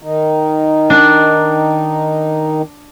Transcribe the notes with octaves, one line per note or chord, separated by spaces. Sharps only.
D#3 D#4
D4